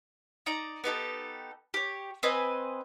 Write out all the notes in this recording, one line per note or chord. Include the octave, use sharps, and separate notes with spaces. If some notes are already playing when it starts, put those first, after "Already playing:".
D#4 D5 A#5
B3 D#4 G4 A4
G4 C#5
C4 B4 D#5 G#5